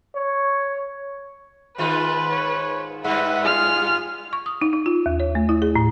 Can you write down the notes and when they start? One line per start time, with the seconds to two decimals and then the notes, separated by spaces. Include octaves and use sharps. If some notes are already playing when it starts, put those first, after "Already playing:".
0.15 C#5
1.78 G#2 D#3 F4 B4
2.31 C#5
3.04 G2 G3 B4 E5 F#5
3.45 F4 G#4 F6
4.33 C#6
4.46 D#6
4.62 D#4
4.73 D#4
4.86 F4
5.06 D#2
5.20 C#5
5.35 A3
5.49 E4
5.62 G#4
5.76 A2